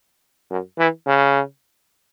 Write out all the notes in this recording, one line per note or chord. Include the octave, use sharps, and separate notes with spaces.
F#2
E3
C#3